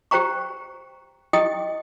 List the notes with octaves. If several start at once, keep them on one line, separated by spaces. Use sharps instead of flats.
G4 C5 G5 A#5 C#6
E4 G4 D#5 G5 D#6